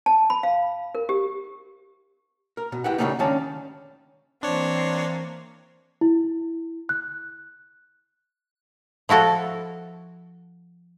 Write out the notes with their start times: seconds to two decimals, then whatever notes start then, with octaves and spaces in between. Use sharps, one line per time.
0.06 A5
0.30 B5
0.43 F5
0.95 A#4
1.09 G4
2.57 A#4
2.72 B2
2.84 E4 G4 B4 F#5
2.98 C#3 E3 G3 A3 A#3 D#4
3.19 D#3 G#3 C#4 D4 F5 A5
4.43 E3 A#3 C4 D4 C#5
6.01 E4
6.89 F#6
9.09 F3 E4 F#4 A4